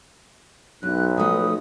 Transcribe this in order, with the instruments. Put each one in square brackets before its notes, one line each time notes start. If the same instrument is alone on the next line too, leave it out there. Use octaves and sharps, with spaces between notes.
[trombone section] B1 [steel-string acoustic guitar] F#2 [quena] F#6
[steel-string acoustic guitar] F3 A3 [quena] D#6